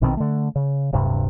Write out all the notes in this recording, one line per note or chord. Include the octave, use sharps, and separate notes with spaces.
A#1 B2 D#3 C4
D3 A3
C#3
D1 G2 C3